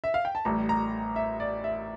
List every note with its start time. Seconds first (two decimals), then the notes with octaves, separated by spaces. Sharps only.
0.04 E5
0.14 F5
0.25 G5
0.35 A5
0.45 A1 A2 G3 A#5
0.69 A#5
1.16 E5
1.40 D5
1.64 E5